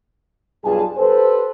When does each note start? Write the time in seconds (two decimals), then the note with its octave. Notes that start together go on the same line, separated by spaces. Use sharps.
0.65 B1 G2 F4 G#4 G#5 A5
0.98 G4 A4 B4 C5